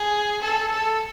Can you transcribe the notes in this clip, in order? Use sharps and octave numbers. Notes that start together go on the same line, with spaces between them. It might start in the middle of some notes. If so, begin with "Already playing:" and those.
Already playing: G#4
A4
A4